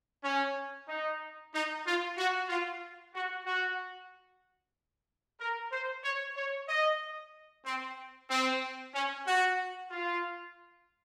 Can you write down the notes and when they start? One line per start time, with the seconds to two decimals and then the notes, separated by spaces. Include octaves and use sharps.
0.23 C#4
0.88 D#4
1.53 D#4
1.85 F4
2.17 F#4
2.49 F4
3.14 F#4
3.46 F#4
5.40 A#4
5.72 C5
6.03 C#5
6.36 C#5
6.68 D#5
7.65 C4
8.30 C4
8.94 C#4
9.26 F#4
9.90 F4